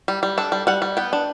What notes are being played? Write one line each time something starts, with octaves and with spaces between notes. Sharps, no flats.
G3
G3
D4 A4
G3
G3 F#5
G3
B3 G5
D4